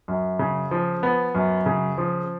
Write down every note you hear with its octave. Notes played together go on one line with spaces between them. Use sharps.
F#2
C#3
F3
B3
F#2
C#3
F3